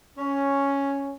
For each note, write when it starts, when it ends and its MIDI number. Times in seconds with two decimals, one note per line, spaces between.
0.18 1.13 61